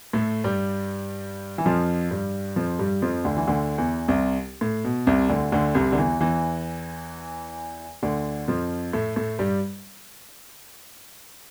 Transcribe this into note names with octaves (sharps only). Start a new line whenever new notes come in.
A2 A3
G2 G3
E3
F2 F3
G2 G3
F2 F3
G2 G3
F2 F3
D2 D3
E3
D2 D3
E2 E3
C2 C3
A2
B2
C2 C3
D2 D3
D2 D3
C2 C3
D3
E2 E3
E2 E3
D2 D3
F2 F3
A2 A3
A2 A3
G2 G3